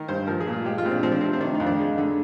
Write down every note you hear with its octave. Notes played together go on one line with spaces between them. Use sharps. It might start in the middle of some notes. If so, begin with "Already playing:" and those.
Already playing: D#3 A#4
G2 C5
F3 A#4
G#4
A#2
F4
G#3 G4
F4
A#2 C4
D4
F3 C4
D4
C3 C4
C4
D#3 D4
D#4
F2
D4
G#3
D3